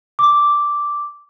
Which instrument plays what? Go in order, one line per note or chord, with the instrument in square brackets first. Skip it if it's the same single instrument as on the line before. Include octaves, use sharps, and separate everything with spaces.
[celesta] D6